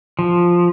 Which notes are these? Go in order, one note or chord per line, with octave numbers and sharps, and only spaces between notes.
F3